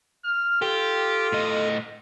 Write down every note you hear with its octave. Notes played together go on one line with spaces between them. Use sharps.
F6
F4 G4 A4
A2 D#5